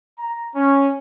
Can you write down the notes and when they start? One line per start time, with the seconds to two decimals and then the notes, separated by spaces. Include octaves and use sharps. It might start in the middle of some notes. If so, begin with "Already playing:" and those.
0.19 A#5
0.55 C#4